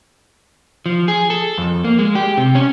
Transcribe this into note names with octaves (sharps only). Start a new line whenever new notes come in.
F3
G#4
A4
F2
A#3
G#3
G4
C3
C#4